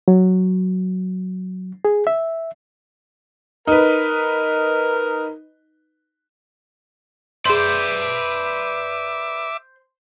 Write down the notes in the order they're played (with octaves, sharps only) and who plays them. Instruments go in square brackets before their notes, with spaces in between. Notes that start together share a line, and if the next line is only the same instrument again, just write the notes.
[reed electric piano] F#3
G#4
E5
[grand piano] D#4 B4 [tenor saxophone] A#4
[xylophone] G#4 C6 [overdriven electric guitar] B4 D5 [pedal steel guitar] C5 [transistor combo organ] E5 D6